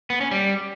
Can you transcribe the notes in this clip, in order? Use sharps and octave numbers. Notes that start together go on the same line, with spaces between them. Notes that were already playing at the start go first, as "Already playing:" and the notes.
B3
C#4
G3